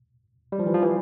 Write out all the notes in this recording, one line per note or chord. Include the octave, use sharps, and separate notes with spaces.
G3
F3
E3
F3
E3